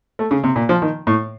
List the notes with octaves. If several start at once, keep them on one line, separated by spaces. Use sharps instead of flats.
A3
C#3
C3
A#2
F3
D#3
A2